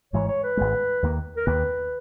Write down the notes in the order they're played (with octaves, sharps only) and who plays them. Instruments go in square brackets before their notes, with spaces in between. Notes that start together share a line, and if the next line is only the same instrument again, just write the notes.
[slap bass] G#1 G#2 E3 G#3 [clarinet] C#5
[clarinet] C#5
B4
[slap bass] G#1 G#2 E3 G#3
D#2 D#3 A#3
[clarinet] A#4
[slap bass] D#2 D#3 A#3 [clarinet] B4